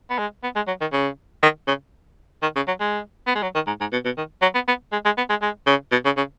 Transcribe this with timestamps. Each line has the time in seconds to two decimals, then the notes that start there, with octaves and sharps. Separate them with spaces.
0.10 B3
0.18 G#3
0.43 B3
0.56 G#3
0.68 F#3
0.81 D#3
0.93 C#3
1.43 D#3
1.68 C#3
2.42 D#3
2.56 C#3
2.67 F#3
2.80 G#3
3.27 B3
3.35 G#3
3.43 F#3
3.55 D#3
3.67 G#2
3.81 G#2
3.93 B2
4.05 B2
4.18 D#3
4.42 F#3
4.54 B3
4.68 B3
4.92 G#3
5.05 G#3
5.17 B3
5.29 G#3
5.42 G#3
5.67 C#3
5.91 B2
6.05 C#3
6.17 C#3